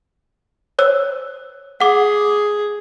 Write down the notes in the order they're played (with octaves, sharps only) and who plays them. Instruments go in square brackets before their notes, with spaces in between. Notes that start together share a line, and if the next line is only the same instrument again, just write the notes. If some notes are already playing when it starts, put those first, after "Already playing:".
[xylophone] C5 C#5 E6
[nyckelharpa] G#4 [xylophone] F#5 D6